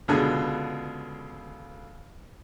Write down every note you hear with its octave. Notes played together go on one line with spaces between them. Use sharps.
C#2 B2 D3 G#4